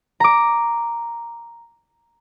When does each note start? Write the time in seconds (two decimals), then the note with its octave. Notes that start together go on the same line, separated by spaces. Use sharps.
0.20 A#5 D6